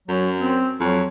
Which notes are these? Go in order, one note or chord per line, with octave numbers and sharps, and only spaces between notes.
F#2 F#3
C4
F2 F#3